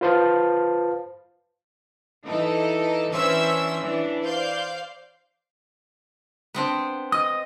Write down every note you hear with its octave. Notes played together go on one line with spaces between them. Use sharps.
F4 B4 C5 F5 A5
E3 D#4 A4
E3 C#4 D4 C5 E5 E6
E3 D4
C5 D5 F5 G6
B3 C4 D4
D#5 D#6